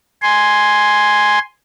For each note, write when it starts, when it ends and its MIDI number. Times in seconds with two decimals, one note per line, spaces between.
0.22 1.39 80
0.22 1.39 84